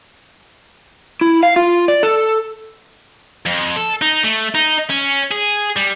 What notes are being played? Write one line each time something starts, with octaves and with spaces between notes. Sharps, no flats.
E4
F5
F4
D5
A4
F2
A4
D#4
A3
D#4
C#4
G#4
G3